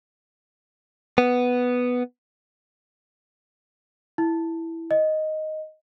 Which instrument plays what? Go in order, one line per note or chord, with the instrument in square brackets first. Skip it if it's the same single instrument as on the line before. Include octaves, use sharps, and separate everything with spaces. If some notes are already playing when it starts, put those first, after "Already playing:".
[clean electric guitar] B3
[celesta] E4
D#5